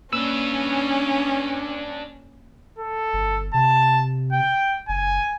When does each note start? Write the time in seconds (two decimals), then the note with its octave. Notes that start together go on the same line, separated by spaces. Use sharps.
0.13 A#3 C#4 D4 B4 E6
2.79 A4
3.13 G1
3.54 C3 A5
4.32 G5
4.89 F#1 G#5